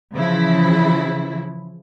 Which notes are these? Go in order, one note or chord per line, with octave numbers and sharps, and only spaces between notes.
C#3 E3 F3 E4